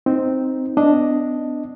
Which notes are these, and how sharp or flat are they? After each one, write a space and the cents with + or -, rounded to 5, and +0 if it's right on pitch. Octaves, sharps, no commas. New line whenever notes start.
C4 +0 D#4 +0
B3 +35 D4 +0 D#5 +0